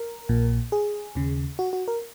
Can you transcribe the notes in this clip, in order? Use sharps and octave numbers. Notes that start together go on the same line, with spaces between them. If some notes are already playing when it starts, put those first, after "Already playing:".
Already playing: A#4
A#1 A#2
G#4
D#2 C#3
F#4
F#4
A#4